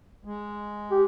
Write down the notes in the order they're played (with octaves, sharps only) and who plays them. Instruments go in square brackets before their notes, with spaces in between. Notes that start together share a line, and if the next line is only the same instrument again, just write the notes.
[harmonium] G#3
[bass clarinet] G4